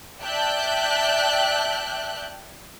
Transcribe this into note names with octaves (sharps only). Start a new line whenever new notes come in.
D5 E5 G5 A5 F#6 G6